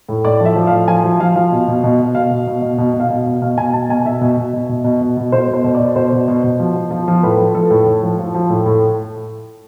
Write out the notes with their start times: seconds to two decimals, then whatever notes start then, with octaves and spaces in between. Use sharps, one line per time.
0.09 A2
0.25 A2 D5
0.40 F3 E5
0.56 F3
0.67 A2 F5
0.88 F3 G#5
1.04 F3
1.20 F3 F5
1.36 F3 F5
1.52 B2
1.68 B2
1.83 B2
2.00 B2
2.15 B2 F5
2.31 B2
2.47 B2
2.62 B2
2.78 B2
2.94 B2
3.00 F5
3.10 B2
3.26 B2
3.42 B2 F5
3.57 B2 G#5
3.73 B2 A5
3.89 B2 G#5
4.05 B2 E5
4.21 B2
4.37 B2
4.53 B2
4.69 B2
4.84 B2
5.01 B2
5.17 B2
5.32 B2 C5
5.48 B2
5.54 C5
5.64 B2
5.75 D5
5.80 B2
5.96 B2 C5
6.12 B2
6.28 B2
6.44 B2
6.59 F3
6.76 F3
6.91 F3
7.08 F3
7.23 A2 B4
7.38 F3
7.55 F3 A4
7.70 A2
7.86 A2
8.02 F3
8.19 F3
8.34 F3
8.50 A2
8.66 A2